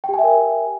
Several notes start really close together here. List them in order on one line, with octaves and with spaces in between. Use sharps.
G5 G4 G#5 E5 A#4